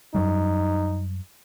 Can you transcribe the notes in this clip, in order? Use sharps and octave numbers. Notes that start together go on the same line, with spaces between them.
F#2 F#3 G3 D#4